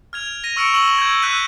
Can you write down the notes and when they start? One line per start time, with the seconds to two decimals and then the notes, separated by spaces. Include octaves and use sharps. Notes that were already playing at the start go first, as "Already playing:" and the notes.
0.13 F6 G#6 F7
0.44 A#6 D#7
0.56 C#6 E6 F6 C#7 D7 F7
0.74 C#6 E6 D#7 E7 F#7 G7
0.98 G6 G#6
1.22 E6 F#6 G6 B6 D#7